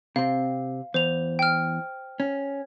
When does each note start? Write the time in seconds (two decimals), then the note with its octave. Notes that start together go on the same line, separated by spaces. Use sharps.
0.16 C3 C4 F5
0.94 E2 C5 F7
1.39 G5 F6
2.20 C#4